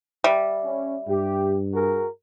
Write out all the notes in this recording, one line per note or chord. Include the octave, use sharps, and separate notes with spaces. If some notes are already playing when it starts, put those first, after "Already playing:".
G3 E5
C#4
G2 G4
F#4 G#4 A#4